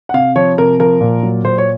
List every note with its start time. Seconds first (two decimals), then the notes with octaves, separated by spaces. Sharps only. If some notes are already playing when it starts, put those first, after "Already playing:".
0.09 F#5
0.14 C3 F5
0.36 F3 C#5
0.58 C3 A#4
0.79 F3 A#4
1.01 A#2
1.23 F#3
1.44 A#2 C5
1.58 C#5